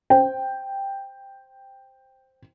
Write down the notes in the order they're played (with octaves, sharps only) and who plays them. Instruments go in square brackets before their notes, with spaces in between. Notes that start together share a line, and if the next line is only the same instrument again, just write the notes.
[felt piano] C5 G5